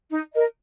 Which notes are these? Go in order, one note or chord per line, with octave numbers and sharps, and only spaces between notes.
D#4
A#4 D#5